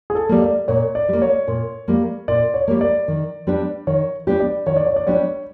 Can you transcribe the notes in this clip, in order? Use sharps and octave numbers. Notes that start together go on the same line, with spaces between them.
G#4
A4
G3 A#3
D5
A#2 C#5
D5
G3 A#3
C#5
A#2
G3 A#3
A#2 D5
C#5
G3 A#3
D5
D#3
G3 B3 D4 G4
D#3 C#5
G3 B3 D4 G4
D5
D#3 C#5
D5
C#5
D5
G3 B3 D4 G4 C#5